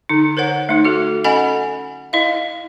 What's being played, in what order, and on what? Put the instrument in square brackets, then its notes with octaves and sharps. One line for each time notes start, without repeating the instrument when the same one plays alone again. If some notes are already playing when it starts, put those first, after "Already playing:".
[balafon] D3 D#4
A#4 C5 C#5 F#5
A3 D#4
F#4 A4
C#4 A4 D#5 F#5 G#5 B5
E4 D#5 F5